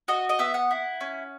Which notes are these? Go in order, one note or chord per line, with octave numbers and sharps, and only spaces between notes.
F#4 D#5
D#5
B3 E5
F#5
E4
C#4